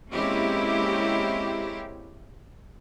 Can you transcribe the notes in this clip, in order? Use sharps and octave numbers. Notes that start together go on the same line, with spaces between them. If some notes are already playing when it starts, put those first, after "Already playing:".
G#3 A#3 C4 C#4 E4 G4